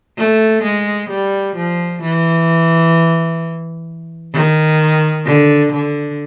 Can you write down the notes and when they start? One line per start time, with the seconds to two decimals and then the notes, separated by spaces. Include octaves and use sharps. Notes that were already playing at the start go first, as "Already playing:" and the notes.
0.18 A3
0.64 G#3
1.09 G3
1.56 F3
2.02 E3
4.34 D#3
5.26 D3
5.72 D3